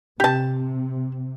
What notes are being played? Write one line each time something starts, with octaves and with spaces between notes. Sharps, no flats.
C3 G4 A5